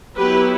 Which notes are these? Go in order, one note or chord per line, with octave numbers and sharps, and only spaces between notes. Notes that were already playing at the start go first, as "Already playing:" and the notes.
F#3 B3 E4 G4 B4